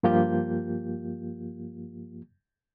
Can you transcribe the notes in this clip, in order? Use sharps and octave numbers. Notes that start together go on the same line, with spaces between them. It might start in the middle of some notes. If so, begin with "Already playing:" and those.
G2 F3 A#3 F4 G4 G6